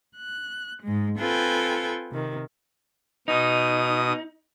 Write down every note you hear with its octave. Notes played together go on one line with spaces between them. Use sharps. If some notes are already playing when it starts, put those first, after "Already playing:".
F#6
G#2 G#3
C4 F4 A4 B4 G5 G#5
C3 D#3
B2 D#4 D#6